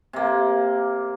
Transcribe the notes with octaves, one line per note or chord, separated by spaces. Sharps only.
C3 A#3